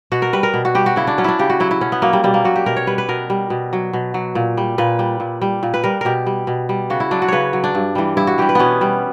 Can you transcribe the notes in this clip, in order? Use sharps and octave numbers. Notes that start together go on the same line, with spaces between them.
B2 F#4
A#4
G3 B4
A#4
B2
F#4
G3 G4
F#4
C#3 E4
D4
F#3 C#4
D4 E4
C#3 G4
F#4
F#3 E4
E4
B2 C#4
B3
F#3 A#3
G3
B2 G3
A#3
F#3 F#4
G4
B2 A#4
C#5
G3 B4
B4
B2 A#4
G3
B2
F#3
B2
F#3
A#2
G3
A#2 B4
G3
A#2
G3
A#2
B4
G3 A#4
B2 G4 A#4
G3
B2
G3
C#3 F#4
E4
F#3 D4
F#4
C#3 B4 C#5
F#3
D4
G2
E3 G3
G2 E4
F#4
E3 G3 G4
B4
B2 B3 C#4
G3